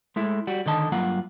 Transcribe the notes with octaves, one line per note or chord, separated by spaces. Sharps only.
G#3 A3 E4
G3 F#4
D3 D#3 D#5 A5
G2 F#3 A#3 F4 F#5